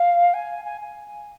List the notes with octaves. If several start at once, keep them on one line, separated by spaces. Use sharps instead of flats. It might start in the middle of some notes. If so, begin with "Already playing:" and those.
Already playing: F5
G#5
G#5
G#5